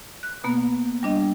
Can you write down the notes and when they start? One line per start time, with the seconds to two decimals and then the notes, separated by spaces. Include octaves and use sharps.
0.23 F#6
0.44 B2 A#3 B3
1.03 G3 D4 D#5